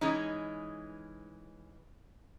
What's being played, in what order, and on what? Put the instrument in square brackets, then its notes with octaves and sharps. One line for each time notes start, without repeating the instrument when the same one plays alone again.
[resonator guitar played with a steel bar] E3 G#3 C#4 D#4